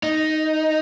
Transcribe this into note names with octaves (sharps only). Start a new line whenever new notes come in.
D#4